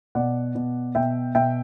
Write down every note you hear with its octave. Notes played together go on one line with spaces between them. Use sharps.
B2 D5 F#5
B2
B2 E5 G5
B2 E5 G5